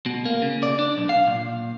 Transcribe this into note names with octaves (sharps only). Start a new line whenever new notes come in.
B2
A#3
C#3
D5
D4
B1
F5
A#2